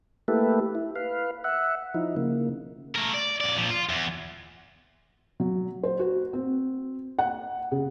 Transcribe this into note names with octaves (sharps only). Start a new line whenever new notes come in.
A3 A#3 E4 G4 A4 B4
E4
B4 F5
E5 F#5
F3 D#4 E4
C#3 A#3
A3 A#4
D5
F2 D5
A#2 F3
F4
E2
F#3
C5
F#4
C4
F#5
C#3